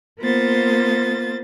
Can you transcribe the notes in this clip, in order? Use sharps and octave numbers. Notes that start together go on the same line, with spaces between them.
A#3 B3 F4 C5 A6